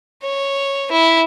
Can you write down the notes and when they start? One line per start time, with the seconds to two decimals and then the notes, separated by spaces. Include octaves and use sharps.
0.23 C#5
0.92 E4